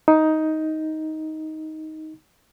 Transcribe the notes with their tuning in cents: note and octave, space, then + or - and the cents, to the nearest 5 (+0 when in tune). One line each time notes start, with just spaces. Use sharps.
D#4 +10